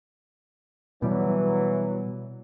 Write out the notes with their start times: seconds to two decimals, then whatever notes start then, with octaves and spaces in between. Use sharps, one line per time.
1.02 B2 E3 F#3 G3